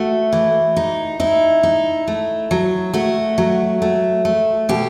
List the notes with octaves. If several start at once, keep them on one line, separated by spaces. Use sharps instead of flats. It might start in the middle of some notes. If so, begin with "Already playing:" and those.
Already playing: A3 F#4
E3
D#4
D#4 E4
D#4
A3
F#3
A3 F#4
F#3
A3
A3
B2 G4